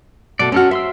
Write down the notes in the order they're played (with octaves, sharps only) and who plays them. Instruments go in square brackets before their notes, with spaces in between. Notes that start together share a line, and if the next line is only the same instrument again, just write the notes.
[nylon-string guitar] B2 A3 [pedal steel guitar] A4 D5
[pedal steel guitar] G#3 A4 F6 [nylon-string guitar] C#4 F#4
[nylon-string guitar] C5 [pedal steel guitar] E5 C6 E6